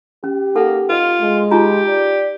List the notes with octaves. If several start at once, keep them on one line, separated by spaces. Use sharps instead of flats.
C#4 G4
A#3 D#4 A4 F#5
F4 B4 D#5
G#3
D#4 F4 G4 A#5
D5